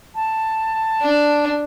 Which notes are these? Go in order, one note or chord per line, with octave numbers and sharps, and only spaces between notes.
A5
D4